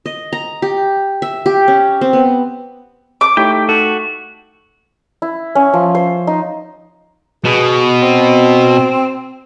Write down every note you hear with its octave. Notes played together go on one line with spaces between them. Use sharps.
D#5
A#5
G4
E5
G4
C#4
C4
B3
D6
A3 D#4 E4 G4 C#5 G5 B6
F#4 A4
E4
C#4
F3
C5
D#4
B2 G#4
C4